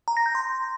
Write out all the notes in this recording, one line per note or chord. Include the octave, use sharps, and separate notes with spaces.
A#5
A#6
G6
C6